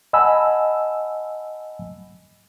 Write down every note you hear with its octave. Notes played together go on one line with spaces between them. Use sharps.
D#5 F#5 G#5 A5 B5 E6